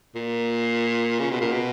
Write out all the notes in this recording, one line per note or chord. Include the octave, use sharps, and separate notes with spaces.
A#2
C#3
B2
A#2
B2